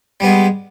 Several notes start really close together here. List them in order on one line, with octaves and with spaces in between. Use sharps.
G3 B3 G#3